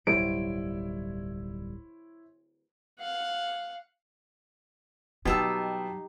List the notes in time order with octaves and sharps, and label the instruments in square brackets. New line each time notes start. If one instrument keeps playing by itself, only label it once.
[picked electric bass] D1 B1 G3 [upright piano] E4 C5 C#5 [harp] D7
[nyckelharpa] F5 F#5
[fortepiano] B2 [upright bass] F#3 [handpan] D#4 G4 [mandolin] G5 A5 E6